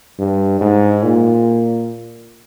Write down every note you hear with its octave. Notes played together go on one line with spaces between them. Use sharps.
G2
G#2
A#2